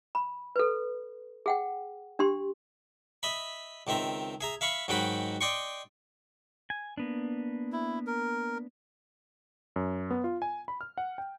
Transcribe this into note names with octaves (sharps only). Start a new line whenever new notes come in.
B5
A4 B4
G#4 F#5 G5
D4 G4 C6
D#5 E5 B5
C#2 D#3 C4 E5 A#5
G#4 E5 A#5
E5 F5 B5 C#6
G#2 D#3 F#3 F#4 G5 B5
D5 D#5 G5 C6 C#6
G#5
A#3 B3 D4
E4
A#4
F#2
B3
F4
G#5
B5
F6
F#5
G5